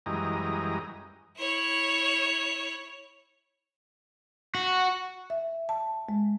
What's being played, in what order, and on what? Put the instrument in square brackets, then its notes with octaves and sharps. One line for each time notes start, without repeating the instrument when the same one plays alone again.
[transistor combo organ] F#2 E3 G3 G#3 D#5 A#5
[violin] E4 C#5
[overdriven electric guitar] F#4
[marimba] E5
A5
G#3